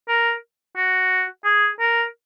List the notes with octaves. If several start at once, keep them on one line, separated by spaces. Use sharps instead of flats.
A#4
F#4
G#4
A#4